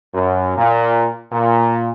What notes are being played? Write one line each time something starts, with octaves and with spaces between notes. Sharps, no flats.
F#2
A#2
A#2